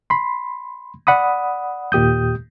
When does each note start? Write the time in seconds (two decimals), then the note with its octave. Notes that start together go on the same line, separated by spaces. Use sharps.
0.10 B5 C6
1.07 D5 F#5 B5 D#6
1.92 D#2 A#2 G4 D#6 G6